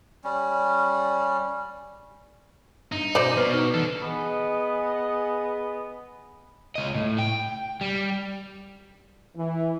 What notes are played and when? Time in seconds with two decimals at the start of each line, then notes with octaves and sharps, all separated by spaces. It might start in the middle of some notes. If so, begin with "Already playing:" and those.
0.24 G3 C#4
2.92 G2 D#4
3.15 B2 C5 D5
3.37 B2 B4 F6
3.54 D#4
3.74 E3 D4 A4
4.02 B3 G#4 D#5
6.75 C#2 D#5
6.95 A2
7.19 G5
7.81 G3
9.36 E3